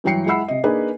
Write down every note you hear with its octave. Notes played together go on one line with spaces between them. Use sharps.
G2 E3 F#3 G5 C7 C#7
G#3 E4 F#5 B5 E6 C7
C3 D#5
A#3 D4 D#4 G#4 B4 D5